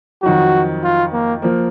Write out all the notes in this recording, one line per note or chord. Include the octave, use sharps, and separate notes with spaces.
F2 D#3 F#3 F#4
F4
A#3
F3 A#3